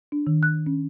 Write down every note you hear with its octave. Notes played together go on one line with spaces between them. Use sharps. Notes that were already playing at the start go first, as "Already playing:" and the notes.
D4
D#3
F#6
C#4